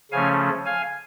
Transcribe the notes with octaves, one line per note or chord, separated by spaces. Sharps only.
C#3 F3 A3 C#4 F5 G#5
F5 G#5